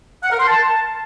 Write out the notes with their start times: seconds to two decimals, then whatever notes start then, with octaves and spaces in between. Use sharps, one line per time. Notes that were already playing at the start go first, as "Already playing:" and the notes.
0.23 F#5
0.31 A#4
0.40 C6
0.48 A5